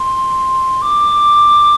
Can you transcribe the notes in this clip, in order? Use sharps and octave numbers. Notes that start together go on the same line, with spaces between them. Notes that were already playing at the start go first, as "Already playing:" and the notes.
Already playing: C6
D6